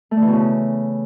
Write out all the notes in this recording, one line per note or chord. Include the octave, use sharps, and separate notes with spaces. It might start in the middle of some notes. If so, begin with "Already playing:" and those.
A3
D3
E3
B2
C#3